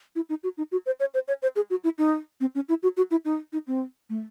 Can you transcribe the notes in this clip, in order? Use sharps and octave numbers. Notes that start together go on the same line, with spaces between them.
E4
D#4
F#4
D#4
F#4
C5
C#5
C5
C#5
C5
G#4
F#4
E4
D#4
C4
C#4
E4
F#4
F#4
E4
D#4
D#4
C4
A3